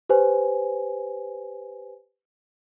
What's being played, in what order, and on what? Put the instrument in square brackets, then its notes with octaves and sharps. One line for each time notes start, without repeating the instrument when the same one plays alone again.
[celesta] G4 B4 C5 G#5